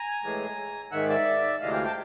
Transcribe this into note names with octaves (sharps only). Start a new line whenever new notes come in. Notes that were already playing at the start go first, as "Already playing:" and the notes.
Already playing: G#5 A#5
A2 E3 G#3
G#2 D#3 G#3 E5 F#5
D5 E5
D2 C3 E3 G#3 D#5 F5
F5 G5
G5 A5